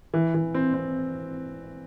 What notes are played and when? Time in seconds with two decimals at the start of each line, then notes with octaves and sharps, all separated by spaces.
0.14 E3
0.34 E3
0.54 C4
0.74 C4